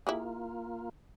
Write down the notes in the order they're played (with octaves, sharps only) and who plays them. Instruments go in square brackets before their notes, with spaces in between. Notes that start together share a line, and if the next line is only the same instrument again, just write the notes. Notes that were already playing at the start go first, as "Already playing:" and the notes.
[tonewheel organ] A#3 F4 [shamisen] E4 G4 G#4